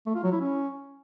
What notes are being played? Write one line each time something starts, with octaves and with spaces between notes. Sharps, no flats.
A3
F4
F#3
E4
C#4